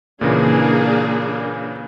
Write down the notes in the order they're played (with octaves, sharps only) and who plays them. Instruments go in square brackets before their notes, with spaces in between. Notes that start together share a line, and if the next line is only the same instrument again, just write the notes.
[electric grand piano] A#2 C#3 E3 [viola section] A#3 D4 G#4